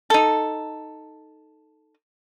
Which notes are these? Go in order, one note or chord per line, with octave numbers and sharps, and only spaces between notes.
D#4 A4